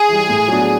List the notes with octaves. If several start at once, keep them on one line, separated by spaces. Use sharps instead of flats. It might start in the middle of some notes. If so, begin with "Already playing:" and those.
Already playing: G#4
E3 G3
A2
F#3 B3 D4 F#4